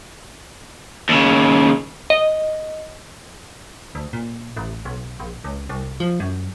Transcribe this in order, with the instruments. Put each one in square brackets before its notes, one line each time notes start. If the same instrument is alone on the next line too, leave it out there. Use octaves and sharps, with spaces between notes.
[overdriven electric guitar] D#2 C#3
[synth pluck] D#5
[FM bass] D2
A#2
A1
B1
A#1
C#2
C2
F3
F#2